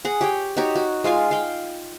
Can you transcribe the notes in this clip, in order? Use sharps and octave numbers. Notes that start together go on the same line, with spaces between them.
G#4 F#5
G4 C#5 G5
D#4 F#4 G4 C#5
F#4
G#3 F4 F5 G#5
F5 G5